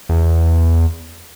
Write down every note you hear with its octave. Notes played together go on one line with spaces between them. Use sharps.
E2